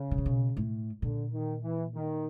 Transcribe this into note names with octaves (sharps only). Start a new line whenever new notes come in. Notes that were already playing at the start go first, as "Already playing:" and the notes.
Already playing: C#3
B2
C3
B2
A2
A#2 D3
D#3
E3
D#3